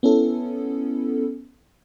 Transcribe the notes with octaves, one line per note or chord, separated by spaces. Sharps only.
B3 C#4 E4 A4